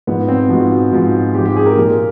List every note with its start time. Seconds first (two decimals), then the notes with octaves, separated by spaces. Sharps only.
0.07 G#2 F3 B3
0.28 C4
0.49 G#2 F3 F#4
0.92 G#2 F3
1.34 G#2 G4
1.38 F3
1.46 G4
1.56 G#4
1.66 A#4
1.77 A#2 F3